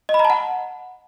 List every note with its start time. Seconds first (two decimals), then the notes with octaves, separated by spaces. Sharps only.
0.09 D#5
0.14 B5
0.19 A#5
0.25 A5
0.30 F#5